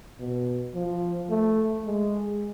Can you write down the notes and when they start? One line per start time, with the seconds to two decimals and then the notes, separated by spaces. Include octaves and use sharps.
0.20 B2
0.74 F3
1.30 A3
1.85 G#3